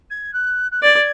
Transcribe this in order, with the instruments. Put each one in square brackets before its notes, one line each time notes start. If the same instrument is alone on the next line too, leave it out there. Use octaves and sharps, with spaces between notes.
[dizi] G#6
F#6
F#6
[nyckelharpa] D5 [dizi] G#6